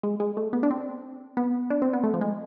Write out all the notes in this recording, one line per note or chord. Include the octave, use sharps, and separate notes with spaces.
G#3
G#3
A3
B3
D4
C4
B3
D4
C4
B3
A3
F3
G#3